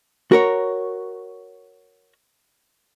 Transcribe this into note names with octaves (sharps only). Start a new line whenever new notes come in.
F#4 A#4 C#5